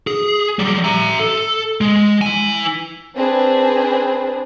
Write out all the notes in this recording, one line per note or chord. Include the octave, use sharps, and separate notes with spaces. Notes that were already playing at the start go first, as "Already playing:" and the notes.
G#4
F#3 G3
E5 A#5
A4
G#3
E4 G#5
C4 D4 G#4 B4